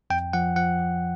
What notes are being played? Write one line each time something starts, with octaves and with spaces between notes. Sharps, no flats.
F2 G5
F3 F#5
F3 F#5
F3